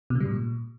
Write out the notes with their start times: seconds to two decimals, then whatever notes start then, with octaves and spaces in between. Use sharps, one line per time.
0.10 B2
0.15 C#3
0.20 G3
0.26 G#2
0.31 A#2